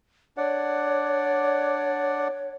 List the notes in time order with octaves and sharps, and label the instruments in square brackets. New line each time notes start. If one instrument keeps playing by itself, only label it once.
[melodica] D4 D5 F#5 [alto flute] C#5